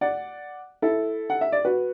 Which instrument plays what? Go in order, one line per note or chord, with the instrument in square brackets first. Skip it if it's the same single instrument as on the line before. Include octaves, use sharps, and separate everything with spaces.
[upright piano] D5 F#5
E4 A4
F#5
E5
D5
F#4 B4